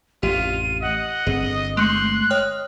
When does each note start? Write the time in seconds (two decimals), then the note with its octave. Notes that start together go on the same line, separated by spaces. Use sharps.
0.23 A1 F2 F4 G4 D#7
0.82 D#5 F#5
1.27 G1 G2 C4 G#4 D#7
1.77 G#3 A3 C6 F#6 C#7
2.30 C#5 D#5 G5 F6